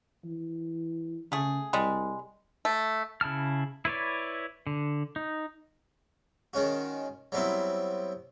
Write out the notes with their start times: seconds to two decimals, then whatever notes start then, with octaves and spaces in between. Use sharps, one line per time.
0.25 E3
1.32 C#3 A3 G#4
1.73 C2 G3 G#3
2.65 A3
3.21 C#3 E4 A5 F6
3.85 E4 B4 C#5 D5
4.67 D3
5.16 D#4
6.54 D#3 G#3 C#4 F#4
7.32 F#3 G3 B3 C4 E4